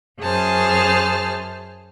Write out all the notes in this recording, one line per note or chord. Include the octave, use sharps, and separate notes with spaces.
F#2 G#4 C5 A5 F6